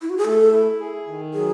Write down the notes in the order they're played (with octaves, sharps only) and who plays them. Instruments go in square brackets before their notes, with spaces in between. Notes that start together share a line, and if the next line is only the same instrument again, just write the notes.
[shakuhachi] E4
F#4
G#4
[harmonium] A3 [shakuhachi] A4
[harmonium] E4
G#4
D#3
[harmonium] F#3 [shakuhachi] G#4